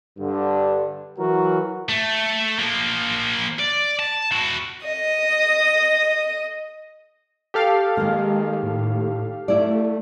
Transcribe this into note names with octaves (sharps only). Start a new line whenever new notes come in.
G2 D3
E3 F#3 F#4 A#4
A3
F3 A#3
D5
A5
E4 F#4
D#5 D#6
G4 A4 F5
D#3 G#3 A#3
A2
A3 E4 D5